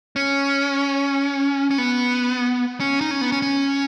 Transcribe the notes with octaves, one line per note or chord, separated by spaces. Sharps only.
C#4
C#4
B3
C#4
D#4
C#4
B3
C#4
C#4